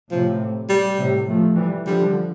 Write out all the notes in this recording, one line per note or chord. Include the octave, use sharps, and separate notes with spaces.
A2 C3 F3
G3
A2 C3
F3 A3
E3 G3
D3 F3 G3